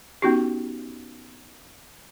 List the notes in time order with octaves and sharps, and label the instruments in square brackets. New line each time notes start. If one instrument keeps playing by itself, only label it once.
[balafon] B3 C#4 D#4 F#4 G4